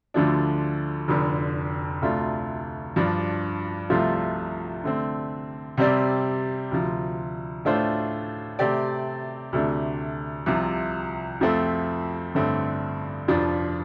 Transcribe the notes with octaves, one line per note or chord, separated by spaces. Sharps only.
D2 D3 F3 A3 D4
F1 F2 D3
D2 C3 A3 D4 F4
G2 F3 D4
C2 C3 F3 A3 F4
D3 A3 C4
C3 G3 C4 G4 D5
D2 C3 F3
A2 A3 D4 F4 C5
C3 A3 C4 G4 D5
D2 C3 A3 D4
C2 C3 F3
F2 F3 A3 C4 A4
A1 G2 D3 A3 C4
F1 F2 F3 D4